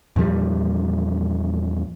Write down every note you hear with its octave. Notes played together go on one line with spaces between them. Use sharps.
E2 A#2 F3 G3